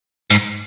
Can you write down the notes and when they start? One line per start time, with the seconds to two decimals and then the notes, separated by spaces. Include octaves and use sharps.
0.31 G#2